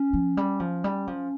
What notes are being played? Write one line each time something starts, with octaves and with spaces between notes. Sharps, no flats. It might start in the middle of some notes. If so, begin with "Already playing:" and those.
Already playing: C#4
F3
G3
F3
G3
F3